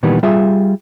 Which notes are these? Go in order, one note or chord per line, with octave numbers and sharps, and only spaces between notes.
A#2 D#3 E3 G3 B3
G3 F4 G#4 E5